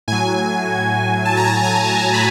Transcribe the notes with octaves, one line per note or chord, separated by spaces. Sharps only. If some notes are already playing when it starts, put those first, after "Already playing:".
A2 F#3 G#5
A5
A#5
A5
A5
G#5
A5
A#5
B5